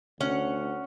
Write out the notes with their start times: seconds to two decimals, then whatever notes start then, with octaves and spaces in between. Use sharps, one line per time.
0.21 D2 C#4 F#5